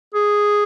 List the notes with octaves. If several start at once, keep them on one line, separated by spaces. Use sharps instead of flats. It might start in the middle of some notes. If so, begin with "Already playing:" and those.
G#4